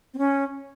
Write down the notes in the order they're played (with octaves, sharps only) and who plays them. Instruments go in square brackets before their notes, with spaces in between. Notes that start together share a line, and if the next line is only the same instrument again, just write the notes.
[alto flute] C4
C#4